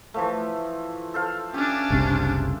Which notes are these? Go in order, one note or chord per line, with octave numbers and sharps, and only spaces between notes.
E3 F3 A3
A4 C5 F5
C#4 D4 G4
F#1 C2 C3